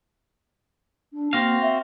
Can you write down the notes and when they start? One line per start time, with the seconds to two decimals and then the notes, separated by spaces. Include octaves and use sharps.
1.13 D4
1.33 A#3 C4 F#4 F5
1.62 E5